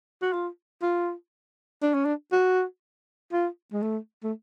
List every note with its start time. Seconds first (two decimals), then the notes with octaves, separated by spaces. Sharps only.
0.22 F#4
0.33 F4
0.82 F4
1.82 D4
1.94 C#4
2.05 D4
2.32 F#4
3.32 F4
3.73 G#3
3.82 A3
4.24 A3